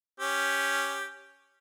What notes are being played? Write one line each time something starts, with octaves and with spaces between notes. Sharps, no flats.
C#4 G4